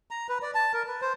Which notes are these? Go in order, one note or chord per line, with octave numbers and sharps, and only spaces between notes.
A#5
B4
D5
A5
A#4
B4
C5